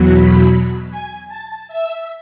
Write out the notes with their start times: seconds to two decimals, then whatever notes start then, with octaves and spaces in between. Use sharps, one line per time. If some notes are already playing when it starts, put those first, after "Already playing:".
Already playing: E2 B2 F#3
0.14 B5
0.90 G#5
1.28 A5
1.68 E5